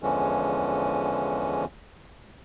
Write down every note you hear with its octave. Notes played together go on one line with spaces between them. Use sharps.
E2 D3 E3 F3 G#3 C#4